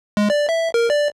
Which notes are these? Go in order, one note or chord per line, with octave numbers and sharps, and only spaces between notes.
G#3
D5
E5
A#4
D5